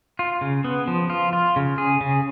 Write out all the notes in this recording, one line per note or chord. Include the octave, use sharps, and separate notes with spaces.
F4
C#3
B3
F3
F4
F4
C#3
G#4
C#3